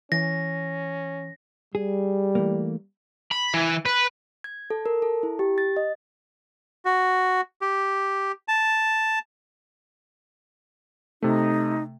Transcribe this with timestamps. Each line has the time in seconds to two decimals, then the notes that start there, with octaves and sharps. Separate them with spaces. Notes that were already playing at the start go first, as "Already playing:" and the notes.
0.12 E3 C#4 A#6
1.75 G3 G#4
2.35 E3 A3 A#3
3.31 B5
3.54 E3
3.85 B4
4.44 G#6
4.70 A4
4.86 A#4
5.02 A4
5.23 E4
5.39 G4
5.58 A6
5.77 D#5
6.85 F#4
7.61 G4
8.48 A5
11.22 C3 A3 D#4